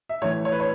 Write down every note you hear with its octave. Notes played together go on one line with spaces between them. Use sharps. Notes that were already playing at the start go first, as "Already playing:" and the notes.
E5
A2 E3 C#5
C#5
B4
C#5